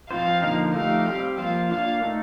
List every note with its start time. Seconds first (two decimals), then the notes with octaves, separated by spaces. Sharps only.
0.10 F3 C4 F4 C5 F5
0.42 D3 F3 A#3 D#4
0.74 F3 A3 D#4 G4 F5
1.06 G3 C4 G4
1.38 F3 A#3 F4 C5 F5
1.70 A#3 D4 F4 F5
2.02 A3 D#4 A4